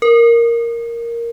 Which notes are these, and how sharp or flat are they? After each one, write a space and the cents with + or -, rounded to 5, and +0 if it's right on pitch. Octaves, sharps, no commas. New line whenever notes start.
A#4 +0